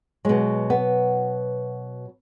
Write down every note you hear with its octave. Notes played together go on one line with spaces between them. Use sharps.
B2 F#3 G#3
B3